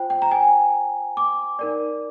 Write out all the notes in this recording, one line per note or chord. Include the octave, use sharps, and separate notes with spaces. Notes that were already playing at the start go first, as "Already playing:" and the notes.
Already playing: F4 C5 G5
G5
A#5
G#5
D6
D#4 A#4 D5